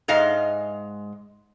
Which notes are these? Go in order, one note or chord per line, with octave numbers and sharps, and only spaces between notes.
G#2 G#3 D#5 F5